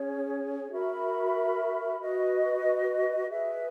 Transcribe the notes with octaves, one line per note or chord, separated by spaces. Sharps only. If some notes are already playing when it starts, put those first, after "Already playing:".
Already playing: C#4 G#4 C#5
F#4 A#4 E5 B5
F#4 B4 D#5
G#4 B4 E5